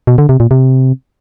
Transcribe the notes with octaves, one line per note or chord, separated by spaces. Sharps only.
B2
D3
C3
A#2
C3